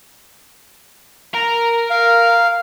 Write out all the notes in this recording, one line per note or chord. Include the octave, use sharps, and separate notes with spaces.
A#4 A#5
F5